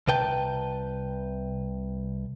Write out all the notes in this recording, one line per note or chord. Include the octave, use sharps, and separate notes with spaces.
C2 C3 B4 G5 A5